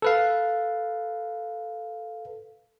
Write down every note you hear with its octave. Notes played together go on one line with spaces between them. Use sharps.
A4 B4 F5